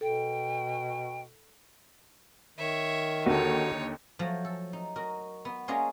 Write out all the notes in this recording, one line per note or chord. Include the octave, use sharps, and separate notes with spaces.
B2 A4 G5
D#3 C#5 E5
D#2 D3 D#4 F#4 A4 C#5
F3 F#3 A3
A4
D#4
F#4 A#4 D#5
B3
A#3 C#4 F4 G#4 D5 D#5